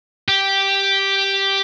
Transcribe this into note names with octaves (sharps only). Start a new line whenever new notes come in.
G4